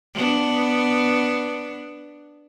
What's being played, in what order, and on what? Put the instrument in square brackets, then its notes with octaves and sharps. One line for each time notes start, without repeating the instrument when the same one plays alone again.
[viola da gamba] B3 D4